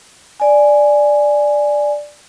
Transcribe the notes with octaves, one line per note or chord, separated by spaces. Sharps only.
D5 G#5